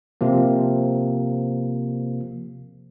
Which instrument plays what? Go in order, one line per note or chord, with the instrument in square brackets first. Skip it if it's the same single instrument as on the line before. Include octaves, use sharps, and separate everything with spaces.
[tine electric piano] C3 F3 A#3